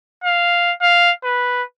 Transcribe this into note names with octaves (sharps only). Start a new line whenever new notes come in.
F5
F5
B4